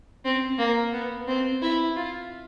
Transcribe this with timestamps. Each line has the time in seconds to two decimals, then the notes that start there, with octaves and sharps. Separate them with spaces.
0.25 C4
0.58 A#3
0.93 B3
1.28 C4
1.62 E4
1.96 F4